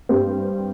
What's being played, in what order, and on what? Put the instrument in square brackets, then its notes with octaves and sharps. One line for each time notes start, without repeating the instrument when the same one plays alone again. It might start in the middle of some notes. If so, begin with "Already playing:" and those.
[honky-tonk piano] G2 G3 C4